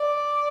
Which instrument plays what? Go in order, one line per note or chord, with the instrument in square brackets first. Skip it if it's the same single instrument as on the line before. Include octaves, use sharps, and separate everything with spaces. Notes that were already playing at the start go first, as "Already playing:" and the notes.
Already playing: [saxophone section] D5